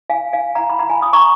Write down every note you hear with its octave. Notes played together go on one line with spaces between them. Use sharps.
F5 G#5
F5 G#5
F#5 A#5
B5
F#5 A#5
G#5 B5
B5 D#6
A#5 C#6